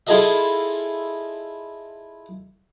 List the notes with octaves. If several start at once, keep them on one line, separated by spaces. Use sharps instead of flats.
E4 F4 G#4 A4 D#5 E5